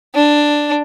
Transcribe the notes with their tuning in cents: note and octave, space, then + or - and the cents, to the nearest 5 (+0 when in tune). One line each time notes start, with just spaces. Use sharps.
D4 +5